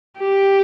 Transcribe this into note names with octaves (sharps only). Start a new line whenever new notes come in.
G4